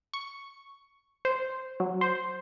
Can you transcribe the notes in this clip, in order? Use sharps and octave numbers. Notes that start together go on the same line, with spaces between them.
C#6
C5
F#3
C5